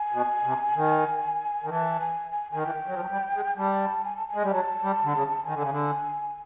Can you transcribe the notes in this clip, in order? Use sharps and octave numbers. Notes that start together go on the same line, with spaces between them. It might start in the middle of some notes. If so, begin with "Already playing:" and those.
Already playing: G#5
B2
C3
D#3
D#3
E3 A5
G#5
G#5
D#3 G#5
E3 G5
F#3
F3
F#3
G3
G#3
G3 A5
G#5
A5
G#5
G#3
G3
F#3 A5
G3
D3
C#3
D#3 G#5
D3
C#3
D3